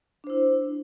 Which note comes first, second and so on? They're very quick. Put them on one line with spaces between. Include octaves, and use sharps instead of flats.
D4 C5 E4